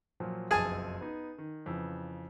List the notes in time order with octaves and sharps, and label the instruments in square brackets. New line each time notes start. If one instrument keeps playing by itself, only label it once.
[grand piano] A#2 F3 F#3
[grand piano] F#1 B1 F2 [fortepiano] G#4 G#5 A5
[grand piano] B3 D#4
D#3
F2 C#3 E3